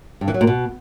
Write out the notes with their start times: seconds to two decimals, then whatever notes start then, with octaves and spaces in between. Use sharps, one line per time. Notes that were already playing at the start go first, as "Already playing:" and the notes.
0.21 G2
0.28 E3
0.34 F#3
0.41 A#2
0.47 B2